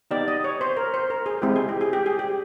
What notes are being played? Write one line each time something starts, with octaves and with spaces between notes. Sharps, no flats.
B3 D#4 G4 D5
D#5
C#5
C5
A#4
C5
A#4
G#4
G#3 C4 E4 G4
G#4
G4
G#4
G4
G#4
G4